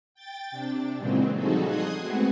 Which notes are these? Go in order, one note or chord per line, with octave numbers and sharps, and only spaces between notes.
G5 A6
C3 D4
A#2 C#3 E3 F#3 G#3 C4
F3 G3 D#4 F#4 G#4 A4
C6 D#6 F#6 G#6
G#3 A3 B3 C4 F#4